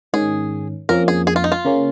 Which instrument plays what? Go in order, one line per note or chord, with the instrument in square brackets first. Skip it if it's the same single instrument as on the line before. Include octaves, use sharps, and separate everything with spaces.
[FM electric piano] G#2 D#3 C#4 [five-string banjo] G#4
[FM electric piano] F2 F3 A#3 C#4 [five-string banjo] A#4
[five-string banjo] G#4
G#4
F4
D#4
F4
[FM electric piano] C#3 A#3 C#4